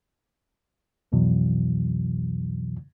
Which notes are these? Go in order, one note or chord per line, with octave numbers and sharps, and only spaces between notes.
C2 F2 B2 E3 F#3